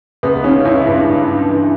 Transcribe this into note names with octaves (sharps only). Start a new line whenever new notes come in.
C#2 B3
C#3 C#4
C#2 E4
G2
G2
G2
E3